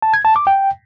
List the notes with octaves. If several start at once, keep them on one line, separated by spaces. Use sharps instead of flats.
A5
G#6
A5
D6
G5